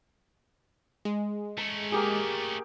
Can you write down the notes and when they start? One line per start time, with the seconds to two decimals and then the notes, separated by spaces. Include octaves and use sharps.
1.05 G#3
1.58 A3 C#4 A#5
1.92 A#3 G4 G#4